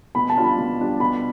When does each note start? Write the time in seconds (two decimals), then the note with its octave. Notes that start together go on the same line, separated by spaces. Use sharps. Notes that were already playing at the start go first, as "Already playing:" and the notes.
0.15 B2 B5
0.30 A5
0.37 G3 D4 F4
0.44 B5
0.58 B2
0.80 G3 D4 F4
1.00 B2 B5